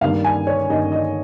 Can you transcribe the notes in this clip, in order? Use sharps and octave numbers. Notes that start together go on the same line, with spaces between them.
G2 D#3 G3 A#3 F5
G#5
C#5
G2 D#3 G3 A#3 D#5
D#5